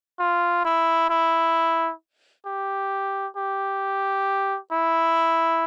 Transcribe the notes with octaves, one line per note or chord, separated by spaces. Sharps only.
F4
E4
E4
G4
G4
E4